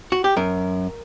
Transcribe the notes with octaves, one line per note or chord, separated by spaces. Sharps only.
F#4
G4
F#2 A#4